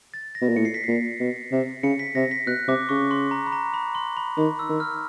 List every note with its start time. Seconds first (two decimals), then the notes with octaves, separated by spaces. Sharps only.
0.14 A6
0.35 A#6
0.41 B2
0.49 A#2
0.56 A2 C#7
0.65 C7
0.74 B6
0.84 A#2 C7
1.20 B2
1.52 C3
1.83 C#3 C#7
1.99 B6
2.15 C3 A#6
2.31 B6
2.46 B2 F#6
2.68 C3 D6
2.89 C#3 C#6
3.11 C6
3.31 A#5
3.47 B5
3.52 A#5
3.74 B5
3.95 C6
4.17 B5
4.38 D#3 B5
4.59 E6
4.69 D#3
4.80 F6